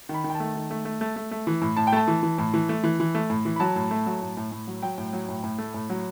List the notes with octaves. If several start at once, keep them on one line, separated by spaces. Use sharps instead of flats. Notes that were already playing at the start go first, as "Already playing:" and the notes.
D#3
B5
D#3
G5
A5
A3
D#3
A3
A3
A3
A3
A3
E3
A2
A2 A5
G5
A3 A5
E3
E3
A2
E3
A3
E3
E3
A3
A2
E3
B5
F#3 A5
A2
A3
F#3
A2
A2
A2
F#3
F#3 G5
A2
F#3
A2
A2
A3
A2
F#3